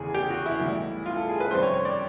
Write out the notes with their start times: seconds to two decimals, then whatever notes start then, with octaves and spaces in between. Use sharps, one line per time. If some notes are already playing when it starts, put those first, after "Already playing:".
Already playing: F1 E2 C#3 E3 G#4
0.14 G4
0.30 F#4
0.46 E4
0.60 B1 A2 E3 G3
1.06 F4
1.17 A4
1.29 G#4
1.40 B4
1.51 F#1 F2 C3 D#3 G3 C5
1.63 C#5
1.74 C#5
1.85 D5